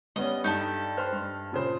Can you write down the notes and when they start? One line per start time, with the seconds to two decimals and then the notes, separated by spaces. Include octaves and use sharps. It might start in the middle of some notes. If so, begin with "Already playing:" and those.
0.16 G3 B3 C#4 D#5
0.44 G2 D#4 G4 A4
0.97 B4 C5 F6
1.13 G2
1.52 A#2 C#3 C5